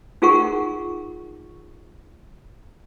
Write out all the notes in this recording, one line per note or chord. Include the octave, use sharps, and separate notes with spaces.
D#4 F4 G#4 A#4 F#5 C#6